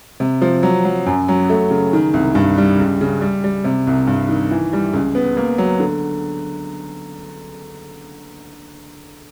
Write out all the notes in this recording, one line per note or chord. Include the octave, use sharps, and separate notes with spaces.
C3
F3
F#3
F#3
F#2
F#3
A3
C#3
D#3
C2
G2
G3
C#2
C#3
G3
G3
C3
C2
G2
D#3
E3
G3
C#2
B3
A#3
F#3
D3